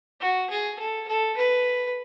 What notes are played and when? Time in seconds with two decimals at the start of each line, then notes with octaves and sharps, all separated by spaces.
0.20 F#4
0.50 G#4
0.79 A4
1.08 A4
1.37 B4